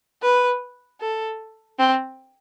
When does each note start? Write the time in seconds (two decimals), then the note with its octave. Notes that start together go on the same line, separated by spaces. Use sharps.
0.22 B4
1.00 A4
1.79 C4